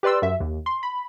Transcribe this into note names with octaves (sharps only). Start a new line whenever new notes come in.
G4 B4 D5 C6 E6
F#2 E5
D#2
C6
B5